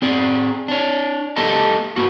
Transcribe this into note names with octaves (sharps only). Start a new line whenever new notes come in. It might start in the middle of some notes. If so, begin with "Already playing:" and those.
C4 G#4 D5
D4 C#5
A#3 G4 A4 D#5 A5
A#3 F#4